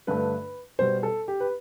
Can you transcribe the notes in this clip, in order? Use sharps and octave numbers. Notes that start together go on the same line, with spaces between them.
G2 D3 A3 B4
B2 G3 C5
A4
G4
B4